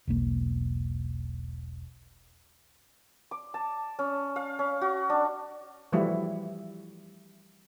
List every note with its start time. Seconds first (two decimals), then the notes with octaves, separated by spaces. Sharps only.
0.07 E1 B1 A#3
3.31 D6
3.54 A5
3.99 C#4
4.36 F5
4.59 C#4
4.81 F#4
5.10 D4
5.92 E3 F3 G3 A3 E4 F#4